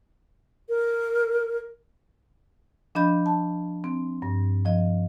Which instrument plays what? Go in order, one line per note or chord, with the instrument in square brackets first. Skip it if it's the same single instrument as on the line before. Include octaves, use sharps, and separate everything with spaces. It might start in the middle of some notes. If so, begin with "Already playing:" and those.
[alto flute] A#4
[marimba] F3 D4 D#5 B5 G6
A5
C4
G2
F3 D#5